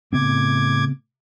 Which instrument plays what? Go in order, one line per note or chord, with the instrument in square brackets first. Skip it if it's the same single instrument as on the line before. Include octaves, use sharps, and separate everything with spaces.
[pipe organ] A2 D6 G#6 [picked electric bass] C#3 B3 C4